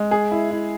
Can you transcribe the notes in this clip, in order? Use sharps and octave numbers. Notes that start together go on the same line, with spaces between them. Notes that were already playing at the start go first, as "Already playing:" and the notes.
Already playing: G#3
G#4
E4
E4